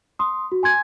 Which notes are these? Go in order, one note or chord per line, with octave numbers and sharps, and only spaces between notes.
C6 D#6
F#4
G#5 C6 G#6